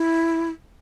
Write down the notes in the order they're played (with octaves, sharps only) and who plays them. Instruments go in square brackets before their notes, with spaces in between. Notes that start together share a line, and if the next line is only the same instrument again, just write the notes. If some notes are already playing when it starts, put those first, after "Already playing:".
Already playing: [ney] E4